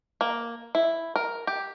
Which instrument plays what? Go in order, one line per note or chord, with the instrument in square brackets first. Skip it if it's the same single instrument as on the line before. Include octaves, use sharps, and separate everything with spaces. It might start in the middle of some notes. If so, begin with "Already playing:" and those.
[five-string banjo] A#3
E4
A#4
G4